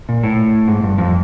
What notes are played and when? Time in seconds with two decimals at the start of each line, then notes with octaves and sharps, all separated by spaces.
0.09 A#2
0.23 A2
0.68 G#2
0.83 G2
0.98 F2